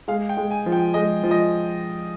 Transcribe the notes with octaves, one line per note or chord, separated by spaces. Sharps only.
G#3 F5
G5
G#3
G#5
F3
G5
G#3 D#5
F3
D#5